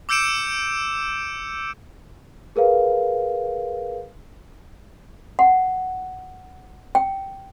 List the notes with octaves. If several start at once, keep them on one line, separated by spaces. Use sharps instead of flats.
D6 E6 G6 C#7 D7 E7
G#4 A#4 B4 F5
F#5
G5